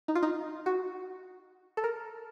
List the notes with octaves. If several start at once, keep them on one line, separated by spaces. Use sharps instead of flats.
D#4
F4
D#4
F#4
A4
A#4